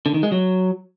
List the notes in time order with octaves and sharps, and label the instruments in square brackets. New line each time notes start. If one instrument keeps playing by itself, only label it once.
[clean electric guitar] D3
D#3
G#3
F#3